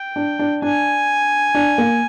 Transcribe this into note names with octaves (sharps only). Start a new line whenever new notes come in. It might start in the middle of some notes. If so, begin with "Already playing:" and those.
Already playing: G5
D4
D4
D4 G#5
D4
A#3